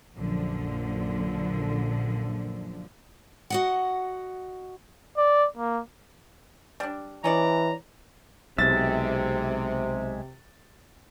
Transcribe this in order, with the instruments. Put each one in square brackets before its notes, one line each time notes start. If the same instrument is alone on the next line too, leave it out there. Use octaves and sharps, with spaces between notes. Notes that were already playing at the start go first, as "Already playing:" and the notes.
[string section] A#1 F#2 A#2 D3 F3
[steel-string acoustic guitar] F#4 D#5 F#5
[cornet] D5
A#3
[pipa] G3 D4
[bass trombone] E3 [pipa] C#4 D#4 D5 [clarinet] A#5
[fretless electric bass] B1 [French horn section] C3 [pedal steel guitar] G#3 E5 [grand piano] A6